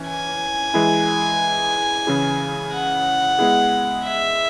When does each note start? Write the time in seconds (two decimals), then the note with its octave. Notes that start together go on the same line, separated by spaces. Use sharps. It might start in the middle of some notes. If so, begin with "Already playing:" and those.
Already playing: E3 C#4
0.08 G#5
0.74 E3 G#3 E4 G#4
2.07 C#3 E3 C#4 E4 G#4
2.73 F#5
3.39 G#3 B3 E4 G#4
4.05 E5